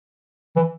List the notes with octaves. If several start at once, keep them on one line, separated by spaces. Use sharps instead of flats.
E3